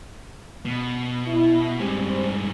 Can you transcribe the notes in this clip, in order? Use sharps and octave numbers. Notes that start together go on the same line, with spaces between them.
B2
E4
G2 G#3 C4 G4 C5